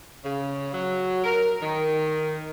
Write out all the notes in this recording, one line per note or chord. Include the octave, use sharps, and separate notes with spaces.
C#3
F#3
A#4
D#3